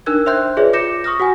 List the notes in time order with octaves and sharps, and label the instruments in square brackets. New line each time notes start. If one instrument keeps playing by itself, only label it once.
[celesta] D4 D#4 A#4 E6 F#6 G#6
C5 E5 G5 C6 F#6 G6
F4 G#4 B4 C#5 D5 E5
F4 D6 G6 A#6 C#7 E7
C#6 D#6 F6 A#6
F#4 F#5 G#5